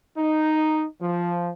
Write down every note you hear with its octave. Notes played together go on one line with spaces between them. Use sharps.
D#4
F3